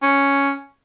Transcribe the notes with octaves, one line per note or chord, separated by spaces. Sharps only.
C#4